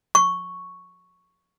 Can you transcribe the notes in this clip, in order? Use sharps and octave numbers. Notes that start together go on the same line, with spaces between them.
C#6